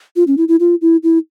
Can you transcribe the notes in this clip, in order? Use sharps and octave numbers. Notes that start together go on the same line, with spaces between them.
F4
C#4
E4
E4
F4
E4
E4